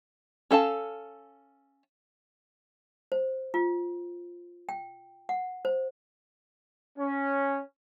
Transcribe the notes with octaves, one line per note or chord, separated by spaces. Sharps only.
C#4 A4 F5 A5
C5
F4
G5
F#5
C5
C#4